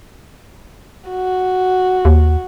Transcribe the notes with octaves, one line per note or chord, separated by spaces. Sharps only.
F#4
D#2